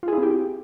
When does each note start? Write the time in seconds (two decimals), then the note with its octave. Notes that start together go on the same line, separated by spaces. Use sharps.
0.03 F4
0.08 G#4
0.13 E4
0.18 C4
0.23 G4